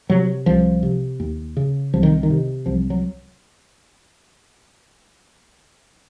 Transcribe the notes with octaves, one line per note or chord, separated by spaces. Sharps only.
C3 F#3
C2 F3
C3
D#2
C#3
C2 F3
D#3
D#3
C3
C2 F3
F#3